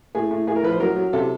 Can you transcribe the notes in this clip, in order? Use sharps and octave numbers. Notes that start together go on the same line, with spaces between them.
A2 G#4
A2
A2 G#4
A#4
F3 B4
C5
F#3 A#4
F#3
C3 A4